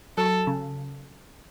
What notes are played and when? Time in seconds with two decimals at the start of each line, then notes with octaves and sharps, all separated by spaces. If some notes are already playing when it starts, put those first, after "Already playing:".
0.18 F#3 A4
0.47 C#3